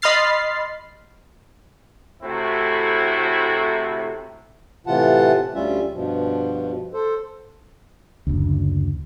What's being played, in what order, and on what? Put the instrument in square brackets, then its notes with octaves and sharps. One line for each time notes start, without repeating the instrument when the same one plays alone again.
[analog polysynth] D#5 B5 C6 F6 A6 C7
[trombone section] A2 C3 A3 C4 E4 F#4
[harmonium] A2 C3 E3 F4 F#5 A5
D2 G3 C#4 F4 E5
G2 B2 F3
A4 C5
[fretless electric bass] F#1 D2